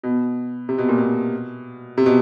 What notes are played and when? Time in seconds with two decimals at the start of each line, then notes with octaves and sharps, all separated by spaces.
0.03 B2
0.69 C3
0.78 B2
0.89 A#2
0.98 B2
1.98 C3
2.06 B2